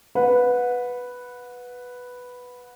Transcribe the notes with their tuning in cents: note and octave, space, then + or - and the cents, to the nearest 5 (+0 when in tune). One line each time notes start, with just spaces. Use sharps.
B4 +0 F#5 -30